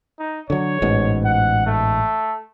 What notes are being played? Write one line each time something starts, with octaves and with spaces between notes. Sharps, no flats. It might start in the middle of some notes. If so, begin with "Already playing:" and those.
D#4
D3 F#3 C#5
A1 G#2 B2
F#5
A3